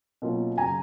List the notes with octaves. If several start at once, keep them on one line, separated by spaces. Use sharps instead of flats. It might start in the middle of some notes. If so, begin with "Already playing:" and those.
B2 F#3 A#3 C#4 F4
F#2 C#3 F#3 G#5 A#5